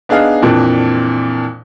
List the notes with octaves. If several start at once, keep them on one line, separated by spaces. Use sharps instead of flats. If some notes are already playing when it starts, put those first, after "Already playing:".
B3 D4 D#4 G#4 F5
F2 A#2 E3 D4